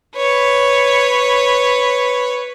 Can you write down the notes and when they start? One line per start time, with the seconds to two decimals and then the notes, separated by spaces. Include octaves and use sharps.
0.16 B4 C#5